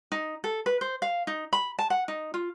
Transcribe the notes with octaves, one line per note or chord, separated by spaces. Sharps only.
D#4
A4
B4
C5
F5
D#4
B5
A5
F#5
D#4
F4